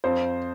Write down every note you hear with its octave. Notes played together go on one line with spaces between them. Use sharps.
F2 C5